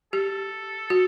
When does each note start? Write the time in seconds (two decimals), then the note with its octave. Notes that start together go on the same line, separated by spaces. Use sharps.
0.13 G4 A4
0.90 F#4